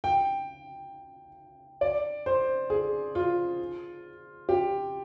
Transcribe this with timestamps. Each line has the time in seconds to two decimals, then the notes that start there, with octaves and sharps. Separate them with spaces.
0.04 G5
1.81 D5
2.26 C5
2.70 G#4
3.15 F4
4.49 G4